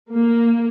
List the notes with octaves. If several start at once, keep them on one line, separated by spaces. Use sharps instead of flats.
A#3